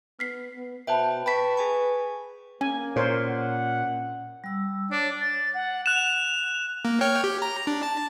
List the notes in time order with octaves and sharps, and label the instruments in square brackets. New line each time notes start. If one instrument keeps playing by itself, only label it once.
[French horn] B3 [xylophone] F6 B6 C7
[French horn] B3
[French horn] B2 [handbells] B4 C5 G5 [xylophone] E5 A5 B5
[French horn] B4 [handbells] G5 A5 C#6 [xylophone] B5 B6
[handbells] G#4 G#5 C#6
[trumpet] A#3 [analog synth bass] C#4 [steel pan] G#5
[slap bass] A#2 [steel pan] A#4 C5 C#5
[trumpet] F#5
[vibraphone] G3 E6
[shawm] D4 [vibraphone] C#5
[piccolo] A6
F#5
[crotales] F#6 E7 [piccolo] F7
[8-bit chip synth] A#3
C#5 G5 F6
G4
A#5
D4
A5